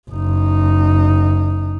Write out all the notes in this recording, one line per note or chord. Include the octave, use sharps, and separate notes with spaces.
F#1 D#4